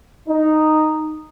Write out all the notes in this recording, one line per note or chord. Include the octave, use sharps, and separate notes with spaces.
D#4